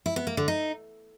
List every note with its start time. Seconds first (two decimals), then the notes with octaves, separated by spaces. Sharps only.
0.06 E4
0.16 B3
0.27 A#3
0.37 D3
0.48 D#4